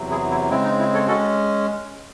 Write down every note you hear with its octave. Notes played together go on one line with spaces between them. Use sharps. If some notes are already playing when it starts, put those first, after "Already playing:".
Already playing: E2 C3 F#3
E4 G#4
E4
C#3 G#3 C4 E4
D#4
E4
A4 C#5
G#3 C#4 F#4 A4